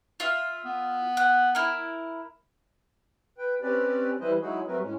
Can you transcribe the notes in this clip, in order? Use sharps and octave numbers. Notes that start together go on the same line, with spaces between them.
F4 E5
B3
F#5
E4 A#4
B4 G5
C4 C#4 G4 B4 D5
E3 G3 E4 B4 C5 D#5
F#3 G#3 D#4 E4 F#4 G#4
F#3 G3 A3 C4 A#4 B4
A2 G#3 C#4